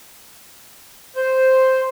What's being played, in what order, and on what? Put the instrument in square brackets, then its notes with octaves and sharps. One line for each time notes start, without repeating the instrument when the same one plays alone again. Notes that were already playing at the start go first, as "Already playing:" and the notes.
[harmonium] C5